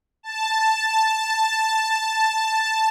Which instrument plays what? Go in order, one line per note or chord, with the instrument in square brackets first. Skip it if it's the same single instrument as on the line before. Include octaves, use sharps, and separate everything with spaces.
[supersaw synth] A5